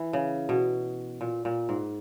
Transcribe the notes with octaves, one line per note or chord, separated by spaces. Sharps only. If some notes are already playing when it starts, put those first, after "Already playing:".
Already playing: E3
C#3
B2
A#2
A#2
G#2